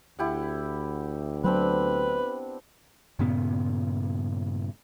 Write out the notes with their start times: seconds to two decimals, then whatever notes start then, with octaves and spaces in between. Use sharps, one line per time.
0.19 D2 E4 G4 F#5
1.44 F#3 B3 C4 D4 B4
3.19 G2 A#2 C#3 B3